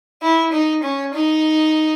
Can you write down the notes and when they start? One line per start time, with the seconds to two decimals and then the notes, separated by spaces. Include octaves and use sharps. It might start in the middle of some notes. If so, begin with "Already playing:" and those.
0.22 E4
0.52 D#4
0.83 C#4
1.13 D#4